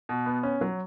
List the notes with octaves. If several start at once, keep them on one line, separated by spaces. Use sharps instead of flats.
B2
B3
C#4
F#3